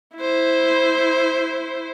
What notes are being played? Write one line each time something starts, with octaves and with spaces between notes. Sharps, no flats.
E4 C5